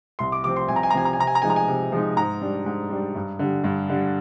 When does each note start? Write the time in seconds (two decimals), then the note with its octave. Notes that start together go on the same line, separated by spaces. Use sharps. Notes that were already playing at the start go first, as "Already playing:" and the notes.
0.19 C2 C6
0.32 D6
0.44 C3 F3 C4 D6
0.56 C6
0.68 C2 G#5
0.76 A#5
0.83 G#5
0.90 A#5
0.94 C3 F3 C4 G#5
1.05 A#5
1.13 G#5
1.18 C3 A#5
1.27 G#5
1.35 A#5
1.42 F3 G#3 D#4 G#5
1.50 A#5
1.56 G#5
1.68 C3
1.92 F3 G#3 D#4
2.17 G#2 A#5
2.41 G3 D4
2.66 G#2
2.90 G3 D4
3.15 G2
3.39 D3 G3
3.64 G2
3.89 D3 G3